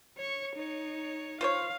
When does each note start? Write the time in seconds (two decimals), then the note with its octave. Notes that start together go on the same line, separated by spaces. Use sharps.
0.17 C#5 C#6
0.55 D#4 C#5
1.41 F4 C5 C#5 F5